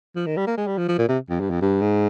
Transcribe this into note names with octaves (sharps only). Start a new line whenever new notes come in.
F3
D#3
G3
A#3
G#3
G3
F3
F3
A#2
C3
F2
G2
F2
G2
G#2